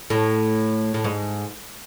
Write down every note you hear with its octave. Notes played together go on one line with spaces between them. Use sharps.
A2
A2
G#2